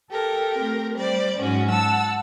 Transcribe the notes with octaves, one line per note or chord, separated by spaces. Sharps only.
G4 A4 A#4
A3 C4
G3 C5 D5
G#2 F#3 C#4 F#4
F#5 A5 E6